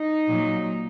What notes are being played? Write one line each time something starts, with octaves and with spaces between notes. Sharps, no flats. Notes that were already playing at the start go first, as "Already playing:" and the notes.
Already playing: D#4
A#2 F#3